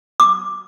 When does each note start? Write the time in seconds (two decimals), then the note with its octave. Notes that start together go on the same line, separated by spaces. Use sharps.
0.20 D6